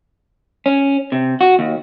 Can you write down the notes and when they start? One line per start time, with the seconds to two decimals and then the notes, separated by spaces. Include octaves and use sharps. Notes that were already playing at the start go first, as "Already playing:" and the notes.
0.66 C#4
1.12 C3
1.41 F#4
1.59 D#2